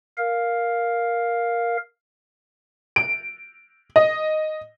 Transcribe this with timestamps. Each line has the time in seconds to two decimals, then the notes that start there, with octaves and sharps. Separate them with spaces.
0.18 A#4 F5
2.96 D7
3.96 D#5